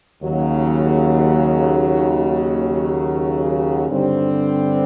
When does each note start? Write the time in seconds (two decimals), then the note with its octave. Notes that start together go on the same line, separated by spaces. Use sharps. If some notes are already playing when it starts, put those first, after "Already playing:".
0.22 D#2 C#3 F#3
3.89 G2 D3 G3 C4